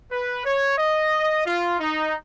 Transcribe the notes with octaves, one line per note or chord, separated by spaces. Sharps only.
B4
C#5
D#5
F4
D#4